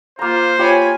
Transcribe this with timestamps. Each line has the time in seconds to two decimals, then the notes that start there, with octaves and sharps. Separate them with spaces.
0.19 A#3 F4 C5 A#5
0.59 F4 G4 C#5 G#5 B5